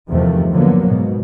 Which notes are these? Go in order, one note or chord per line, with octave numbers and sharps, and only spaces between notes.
E2 G2 C3 D#3 F3 A3
D3 F3 F#3 A#3 B3
G#2 B2